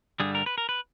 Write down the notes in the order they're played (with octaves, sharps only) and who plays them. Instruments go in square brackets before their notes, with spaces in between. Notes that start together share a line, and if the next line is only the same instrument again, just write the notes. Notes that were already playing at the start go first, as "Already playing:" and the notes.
[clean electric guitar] G2 D3 G3 G#4
A#4
B4
A#4
B4